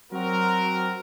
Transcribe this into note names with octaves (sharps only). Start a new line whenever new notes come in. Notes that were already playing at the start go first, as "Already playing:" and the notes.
F#3 C4 F#4 A#4